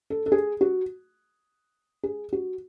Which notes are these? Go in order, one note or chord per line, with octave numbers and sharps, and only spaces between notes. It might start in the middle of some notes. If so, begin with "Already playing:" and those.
A4
A4
G#4
F#4
G#4
F#4